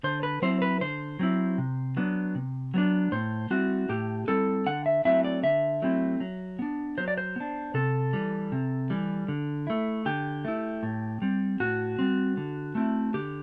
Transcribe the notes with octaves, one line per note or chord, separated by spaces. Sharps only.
D3 C5
B4
F#3 C4 E4 C5
B4
D3 C5
F#3 C4 E4
C3
F#3 B3 D4
C3
F#3 B3 D4
A2 C5
G3 C4 E4 F#4
A2 G4
G3 C4 E4 A4
D3 F#5
E5
F#3 A3 C4 E4 E5
D5
D3 E5
F#3 A3 C4 E4
F#3
B3 D4
F#3 C5
D5
C5
B3 D4
C3 A4
E3 G3
C3
E3 G3
D3
A3 E4
D3 G4
A3 E4
A2
G3 C4
A2 F#4
G3 C4
D3
A3 C4 E4
D3 G4